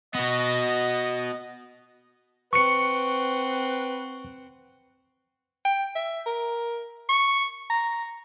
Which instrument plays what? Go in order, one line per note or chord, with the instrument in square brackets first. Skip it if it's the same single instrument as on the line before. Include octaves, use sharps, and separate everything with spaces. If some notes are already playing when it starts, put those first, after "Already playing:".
[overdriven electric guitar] B3 F#4 [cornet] D#5
[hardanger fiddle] C4 F#5 [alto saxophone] B4 [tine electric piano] C#6 C#7
[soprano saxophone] G5
E5
A#4
C#6
A#5